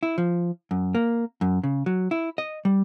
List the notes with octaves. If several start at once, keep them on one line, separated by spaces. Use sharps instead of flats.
E4
F3
F#2
A#3
F#2
C#3
F#3
E4
D#5
G3